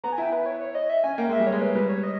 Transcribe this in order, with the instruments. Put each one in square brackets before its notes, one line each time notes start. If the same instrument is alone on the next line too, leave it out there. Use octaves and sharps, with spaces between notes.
[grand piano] B3 [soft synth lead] A#5
[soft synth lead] G#5
[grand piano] E4 [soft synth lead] G5
[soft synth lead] B4
C#5
C#5
D#5
E5
[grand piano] C#4 [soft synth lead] G#5
[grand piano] A#3 [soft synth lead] G5
[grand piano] G#3 [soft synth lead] E5
[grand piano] G3
[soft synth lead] C#5
[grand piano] G#3
[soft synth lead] B4
[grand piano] G3 [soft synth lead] B4
[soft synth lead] C#5
D#5